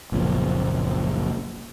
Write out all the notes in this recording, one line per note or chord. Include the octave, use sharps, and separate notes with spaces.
F#1 B1 A#2 F3